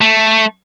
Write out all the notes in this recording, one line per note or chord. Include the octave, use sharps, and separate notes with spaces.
A3